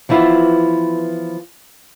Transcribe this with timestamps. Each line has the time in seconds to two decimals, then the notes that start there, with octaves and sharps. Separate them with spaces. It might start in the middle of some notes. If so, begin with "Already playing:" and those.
0.09 E3 F3 B3 E4 F4